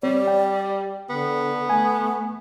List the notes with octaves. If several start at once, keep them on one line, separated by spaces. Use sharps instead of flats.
G3 C4 C#5 D5
G5
D3 B3
A3 G#5